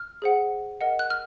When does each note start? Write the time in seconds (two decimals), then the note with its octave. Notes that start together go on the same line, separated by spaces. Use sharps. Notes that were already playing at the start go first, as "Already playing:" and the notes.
Already playing: F6
0.22 G#4 C5 F#5
0.81 A#4 D#5 F#5
0.99 F#6
1.10 F6